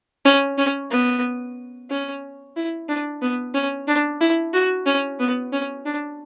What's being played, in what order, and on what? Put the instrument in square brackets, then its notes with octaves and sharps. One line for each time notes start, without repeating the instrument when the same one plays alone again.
[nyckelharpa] C#4
C#4
B3
C#4
E4
D4
B3
C#4
D4
E4
F#4
C#4
B3
C#4
D4